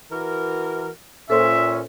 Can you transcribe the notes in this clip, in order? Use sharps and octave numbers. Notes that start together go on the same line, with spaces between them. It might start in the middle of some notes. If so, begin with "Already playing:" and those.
E3 F#4 A#4
A#2 C#4 A4 C5 E5 C6